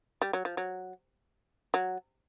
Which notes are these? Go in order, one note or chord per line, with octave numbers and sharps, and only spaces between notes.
G3
F#3
F3
F#3
F#3